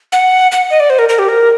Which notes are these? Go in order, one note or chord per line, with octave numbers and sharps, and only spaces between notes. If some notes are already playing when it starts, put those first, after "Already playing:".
F#5
F#5
D#5
D5
C5
A#4
A#4
G4
A#4